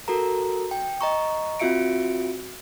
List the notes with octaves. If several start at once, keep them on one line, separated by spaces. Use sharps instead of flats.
F#4 A4 A#4 A#5
G5
D#5 A#5 C#6
C4 F4 F#4 E5 C#7 D7